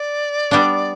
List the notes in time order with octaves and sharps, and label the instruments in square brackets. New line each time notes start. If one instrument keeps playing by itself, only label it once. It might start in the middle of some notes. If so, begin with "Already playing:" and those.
Already playing: [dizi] D5
[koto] G3 B3 D4